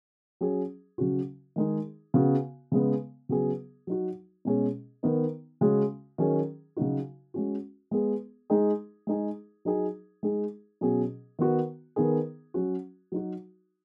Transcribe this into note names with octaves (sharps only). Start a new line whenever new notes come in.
F#3 C#4 G#4
C#3 F#3 C#4 F#4
D#3 G#3 D#4 G#4
C#3 B3 F#4
C#3 G#3 B3
C#3 F#3 B3 G#4
F#3 D#4 F#4
B2 G#3 C#4 G#4
D#3 B3 D#4
C#3 G#3 C#4 F#4
D#3 F#3 C#4 G#4
C#3 F#3 D#4 F#4
G#3 C#4 F#4
G#3 B3 G#4
G#3 D#4 G#4
G#3 D#4 G#4
F#3 D#4 G#4
G#3 D#4 G#4
B2 F#3 C#4 G#4
D#3 B3 F#4
D#3 B3 D#4 G#4
F#3 C#4 F#4
F#3 D#4 F#4